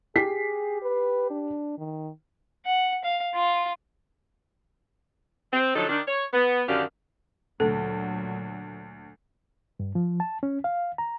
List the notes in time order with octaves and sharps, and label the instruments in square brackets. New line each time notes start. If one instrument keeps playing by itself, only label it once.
[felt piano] G4 B6 C7 [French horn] G#4
[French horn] B4
D4
D#3
[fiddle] F#5
F5
F4
[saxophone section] C4
D3 F3 F#3 D#4 A4
D#3 D4
C#5
B3
F#2 D3 D#3 G4 D5 F5
[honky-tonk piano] D2 [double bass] A#2 F#3 [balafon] A4
[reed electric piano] G2
F3
A5
C#4
F5
A#5